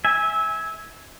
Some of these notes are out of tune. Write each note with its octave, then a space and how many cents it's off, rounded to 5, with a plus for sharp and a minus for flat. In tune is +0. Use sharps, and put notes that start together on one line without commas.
E5 -20 G#5 +0